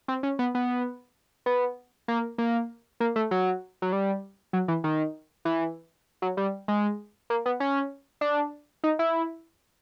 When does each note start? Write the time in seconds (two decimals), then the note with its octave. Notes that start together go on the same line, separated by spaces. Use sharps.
0.08 C4
0.23 C#4
0.39 B3
0.55 B3
1.46 B3
2.08 A#3
2.38 A#3
3.00 A#3
3.16 A3
3.31 F#3
3.82 F#3
3.93 G3
4.53 F#3
4.68 E3
4.84 D#3
5.45 E3
6.22 F#3
6.37 G3
6.68 G#3
7.30 A#3
7.46 B3
7.60 C#4
8.21 D4
8.84 D#4
8.99 E4